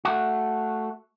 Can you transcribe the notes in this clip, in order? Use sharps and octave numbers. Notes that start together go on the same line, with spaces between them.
A3 F#4